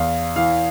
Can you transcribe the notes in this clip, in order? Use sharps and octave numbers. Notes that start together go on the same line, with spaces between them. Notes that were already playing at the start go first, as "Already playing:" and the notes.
Already playing: E2 F5
E3 F5